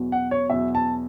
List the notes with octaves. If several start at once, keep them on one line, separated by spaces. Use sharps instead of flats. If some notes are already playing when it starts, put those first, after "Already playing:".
Already playing: E2 B2 F#3
F#5
C#5
E2 B2 F#3 E5
A5